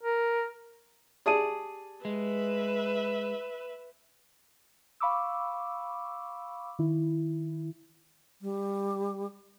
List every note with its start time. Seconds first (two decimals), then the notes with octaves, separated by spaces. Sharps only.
0.03 A#4
1.26 G4 G#4 D5 A5 D#6 D#7
2.05 G#3 B4 E5
5.00 F5 B5 C#6 D6 E6
6.79 D#3 E4
8.42 G3